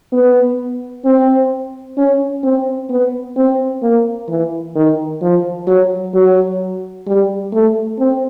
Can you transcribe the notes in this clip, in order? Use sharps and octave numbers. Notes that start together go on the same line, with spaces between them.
B3
C4
C#4
C4
B3
C4
A#3
E3
D#3
F3
F#3
F#3
G3
A3
C4